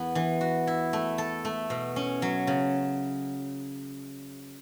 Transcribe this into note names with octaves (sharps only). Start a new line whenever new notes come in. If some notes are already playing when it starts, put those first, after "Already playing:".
Already playing: E2 B3
E3
F#4
E4
A3
A4
A3
B2
C#4
F#3
C#3